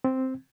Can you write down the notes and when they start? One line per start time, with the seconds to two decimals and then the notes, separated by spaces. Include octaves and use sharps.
0.04 C4